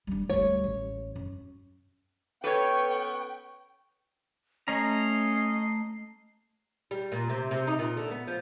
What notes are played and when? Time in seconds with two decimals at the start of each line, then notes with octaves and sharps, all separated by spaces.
0.07 G3 D4
0.30 D2 G3 C#5
0.64 A1
1.15 F#2
2.44 B3 C#4 A4 B4 C#5 G5 C#6
4.68 A3 C#4 D#5 A#5 C7
6.91 G3
7.12 A#2
7.30 C3
7.51 C3
7.67 D#4
7.79 A#2
7.97 D3
8.11 B3
8.27 F3